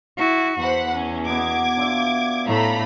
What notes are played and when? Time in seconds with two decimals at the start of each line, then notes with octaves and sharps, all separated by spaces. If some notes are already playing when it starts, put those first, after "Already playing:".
0.18 E4 F#4
0.60 E2 C5 F#5 B5
0.95 C#4
1.25 B2 B3 D6 G#6
1.77 D4 F4 E5
2.46 A2 A3 F5 A#5 B5